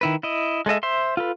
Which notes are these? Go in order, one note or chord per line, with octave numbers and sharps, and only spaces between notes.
D#3 E4 B4
E4 D#5
G#3 A4 D#5 E5
C5 E5 C6
F4 A4 B4